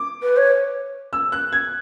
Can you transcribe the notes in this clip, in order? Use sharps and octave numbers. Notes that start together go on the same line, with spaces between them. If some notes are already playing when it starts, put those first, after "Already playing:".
Already playing: D6
B4
C#5
E6
F#6
G#6